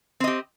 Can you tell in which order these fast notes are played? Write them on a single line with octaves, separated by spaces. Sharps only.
C4 D#5 G4